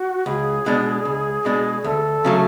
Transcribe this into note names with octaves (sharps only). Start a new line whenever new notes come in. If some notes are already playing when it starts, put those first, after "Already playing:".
Already playing: F#4
C#2 G#4
B2 G#3 D4
C#2
B2 G#3 D4
D2 A4
C#3 F#3 A3